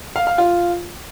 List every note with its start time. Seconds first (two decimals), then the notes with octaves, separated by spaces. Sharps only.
0.16 F5
0.27 F5
0.38 F4